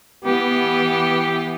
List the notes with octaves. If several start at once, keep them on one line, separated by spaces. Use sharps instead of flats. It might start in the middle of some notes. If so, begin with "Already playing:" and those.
E3 B3 G4